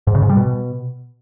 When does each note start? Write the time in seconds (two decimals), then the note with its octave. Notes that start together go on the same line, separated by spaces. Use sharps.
0.07 G#2
0.15 C#3
0.22 G#2
0.29 G3
0.37 B2